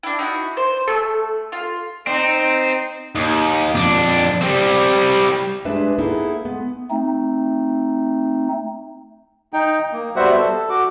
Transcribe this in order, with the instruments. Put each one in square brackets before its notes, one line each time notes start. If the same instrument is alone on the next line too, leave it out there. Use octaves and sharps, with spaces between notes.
[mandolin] D4 E4
D#4 E4 F#4
C5
[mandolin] A3 [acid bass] A4
[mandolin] F4
[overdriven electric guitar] C4 [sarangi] D#4
[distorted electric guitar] D#2
F2 D4
G3 C4
[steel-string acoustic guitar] G3 G#3 D4 G#4 B4 E5
A#3 B3 D#4 E4 G#4 A4
G#3 B3
[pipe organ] A3 C4 D#4
[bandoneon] D#4 G5
A#3
G3 B3 F#4 C5 E5 F#5
A4
F#4 D6